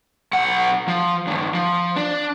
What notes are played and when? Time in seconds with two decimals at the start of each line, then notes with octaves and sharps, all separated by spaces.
0.33 B1 F#5
0.88 F3
1.27 G2 D#3
1.54 F3
1.96 D4